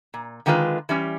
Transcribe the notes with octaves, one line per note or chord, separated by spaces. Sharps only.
A#2
D3 D#3 G#3 F4 B4
E3 G3 C#4